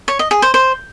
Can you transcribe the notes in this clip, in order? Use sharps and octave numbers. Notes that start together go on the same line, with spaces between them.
C#5
D#5
G#4
C5
C5